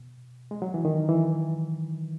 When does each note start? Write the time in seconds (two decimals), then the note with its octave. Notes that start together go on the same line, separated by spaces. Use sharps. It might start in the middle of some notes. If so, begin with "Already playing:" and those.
Already playing: B2
0.51 G#3
0.62 F#3
0.74 E3
0.85 D#3
1.09 E3